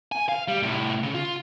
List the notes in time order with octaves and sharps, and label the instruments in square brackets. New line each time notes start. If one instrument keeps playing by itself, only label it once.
[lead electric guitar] G#5
F5
G3
C2 A2
C#3
F4